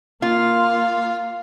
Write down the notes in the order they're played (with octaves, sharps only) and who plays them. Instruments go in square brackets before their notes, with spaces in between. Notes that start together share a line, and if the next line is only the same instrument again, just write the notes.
[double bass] A#3 [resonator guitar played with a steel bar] F4 [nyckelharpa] F5